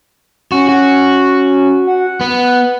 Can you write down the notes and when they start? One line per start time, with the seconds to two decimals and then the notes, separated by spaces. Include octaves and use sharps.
0.52 C#4 F#4
0.69 F#4
1.87 F#5
2.21 B3